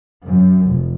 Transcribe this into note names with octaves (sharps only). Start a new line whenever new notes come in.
F#2
F1